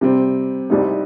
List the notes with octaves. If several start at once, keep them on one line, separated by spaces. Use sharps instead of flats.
C3 G3 C4
C2 C3 G3 C4 D#4